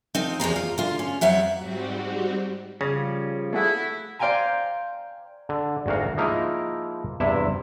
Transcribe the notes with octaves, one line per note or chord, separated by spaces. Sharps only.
F3 C4 D#4
E2 C3 F3 A#5
F4
D3 F4
C#4
F2 F#3 E5 F#5
G#2 G3 C4 F#4 G4
C#3 F3 G3 C#4
A3 E4 G#4 F#5
C5 D5 F5 G5 G#5 A#5
D3
G#1 D2 F#4 A#4 F5
F3 G#3 A#3 D#4 E4 A#4
E2 G2 C3 E4 E5